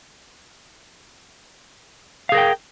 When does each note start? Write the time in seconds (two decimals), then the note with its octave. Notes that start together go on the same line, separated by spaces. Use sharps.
2.29 F5
2.32 G#4
2.35 A#4
2.38 G5